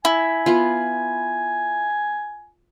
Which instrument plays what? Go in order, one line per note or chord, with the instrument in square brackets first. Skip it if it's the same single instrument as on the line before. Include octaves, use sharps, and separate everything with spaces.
[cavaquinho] E4 [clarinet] G#5
[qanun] B3 F4